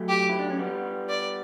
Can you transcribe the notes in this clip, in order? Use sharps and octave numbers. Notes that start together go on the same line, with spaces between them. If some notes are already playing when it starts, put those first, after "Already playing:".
Already playing: F#3 A3
G4
E4
D4
C#4
G3 B3
D5